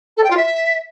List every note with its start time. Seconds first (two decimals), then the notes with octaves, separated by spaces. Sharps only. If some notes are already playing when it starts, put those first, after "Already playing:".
0.17 A4
0.23 G5
0.30 F4
0.37 E5